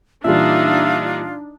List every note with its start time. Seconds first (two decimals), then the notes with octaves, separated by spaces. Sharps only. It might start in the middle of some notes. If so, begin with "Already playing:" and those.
0.24 A#2 E3 G3 D4 D#4 F4 E5